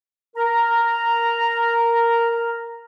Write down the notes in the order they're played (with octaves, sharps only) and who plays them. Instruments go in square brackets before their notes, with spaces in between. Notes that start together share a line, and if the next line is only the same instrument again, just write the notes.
[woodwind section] A#4 A#5